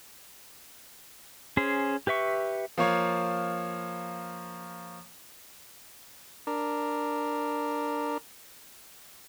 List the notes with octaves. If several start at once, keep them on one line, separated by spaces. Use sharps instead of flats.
C#4 G#4 C5
G4 B4 E5 C#6
F3 A#3 F4 C#5
D4 A#4